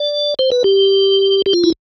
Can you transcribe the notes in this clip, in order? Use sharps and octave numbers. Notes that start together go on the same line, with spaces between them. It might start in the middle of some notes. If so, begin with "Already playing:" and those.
Already playing: D5
C5
B4
G4
G4
F4
E4